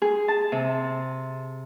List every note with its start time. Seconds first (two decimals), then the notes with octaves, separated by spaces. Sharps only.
0.02 G#4
0.28 A5
0.52 C3